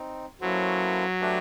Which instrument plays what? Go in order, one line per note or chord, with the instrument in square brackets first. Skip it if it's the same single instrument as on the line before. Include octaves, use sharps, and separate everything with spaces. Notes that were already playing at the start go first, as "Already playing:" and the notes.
Already playing: [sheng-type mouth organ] C4 D#4
[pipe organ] F#3 [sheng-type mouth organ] A#3 C#4 E4 A4 C5
[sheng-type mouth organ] A3 D4 G4 B4